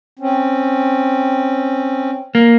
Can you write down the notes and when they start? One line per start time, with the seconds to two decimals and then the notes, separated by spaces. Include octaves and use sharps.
0.19 C4 C#4
2.35 A#3